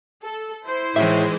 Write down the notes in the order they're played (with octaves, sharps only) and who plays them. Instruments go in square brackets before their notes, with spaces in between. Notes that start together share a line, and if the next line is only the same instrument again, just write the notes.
[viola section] A4
E4 C5
[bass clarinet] A2 [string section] D#3 E3 G#3 [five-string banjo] E5